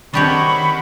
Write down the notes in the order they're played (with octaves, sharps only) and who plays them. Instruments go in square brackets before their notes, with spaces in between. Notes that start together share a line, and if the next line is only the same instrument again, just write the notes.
[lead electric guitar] D#3 [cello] C4 F#5 [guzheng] D4 G4 C#5 [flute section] B5 C#6